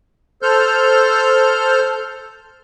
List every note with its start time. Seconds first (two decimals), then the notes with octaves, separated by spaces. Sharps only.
0.42 A4 C5 F6 G6